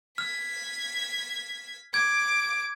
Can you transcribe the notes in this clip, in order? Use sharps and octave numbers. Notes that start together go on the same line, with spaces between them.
F6 G#6 B6
D6 G#6